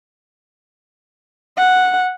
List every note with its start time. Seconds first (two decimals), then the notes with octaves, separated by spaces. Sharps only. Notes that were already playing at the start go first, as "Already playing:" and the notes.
1.57 F#5